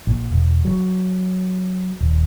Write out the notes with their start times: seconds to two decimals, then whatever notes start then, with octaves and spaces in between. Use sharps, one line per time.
0.07 A#1
0.30 E1
0.65 F#3
2.01 D#1